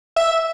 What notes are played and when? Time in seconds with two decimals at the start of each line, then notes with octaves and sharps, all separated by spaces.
0.16 E5